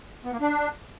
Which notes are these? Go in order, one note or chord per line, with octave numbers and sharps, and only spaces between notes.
B3
A#3
D4